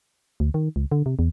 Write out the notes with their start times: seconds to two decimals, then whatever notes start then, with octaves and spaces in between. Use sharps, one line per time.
0.40 D2
0.54 D#3
0.76 C#2
0.92 D3
1.06 C3
1.19 E2